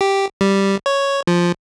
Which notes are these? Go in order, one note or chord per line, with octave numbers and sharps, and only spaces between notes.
G4
G3
C#5
F3